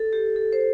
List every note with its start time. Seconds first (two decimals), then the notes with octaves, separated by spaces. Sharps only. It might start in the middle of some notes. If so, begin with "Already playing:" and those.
Already playing: A4
0.13 G4
0.36 A4
0.53 C5